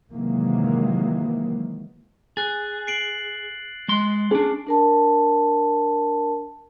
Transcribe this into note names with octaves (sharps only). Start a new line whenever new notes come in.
C3 D#3 E3 F#3 G#3 A#3
G#4 F#6 A6
C7 D7 F#7
G#3 C6
C#4 D4 G#4
D4 A#4 A5